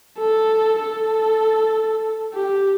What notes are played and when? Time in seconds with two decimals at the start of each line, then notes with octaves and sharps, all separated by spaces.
0.18 A4
0.80 A4
2.34 G4